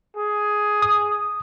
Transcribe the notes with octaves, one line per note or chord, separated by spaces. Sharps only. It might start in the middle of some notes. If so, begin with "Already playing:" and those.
G#4
D#6